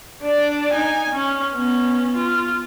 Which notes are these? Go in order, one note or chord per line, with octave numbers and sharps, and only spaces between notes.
D4 D5
D#4 G#5
C#4
B3 C#4
F4